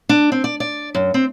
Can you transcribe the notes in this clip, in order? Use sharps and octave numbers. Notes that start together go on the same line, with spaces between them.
D4
C4
D5
D5
F#2
C4